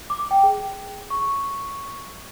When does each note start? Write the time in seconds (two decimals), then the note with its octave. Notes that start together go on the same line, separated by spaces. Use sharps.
0.10 D6
0.31 G5
0.43 G#4
1.10 C#6